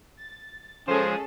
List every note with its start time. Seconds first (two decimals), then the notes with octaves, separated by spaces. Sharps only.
0.17 A6
0.88 F3 G#3 C#4 G#4 A4 C5 A5